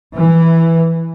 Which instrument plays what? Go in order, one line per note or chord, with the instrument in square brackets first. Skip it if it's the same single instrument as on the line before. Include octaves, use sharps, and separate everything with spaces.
[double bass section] E3